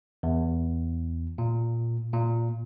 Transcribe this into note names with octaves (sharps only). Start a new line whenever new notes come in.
E2
A#2
A#2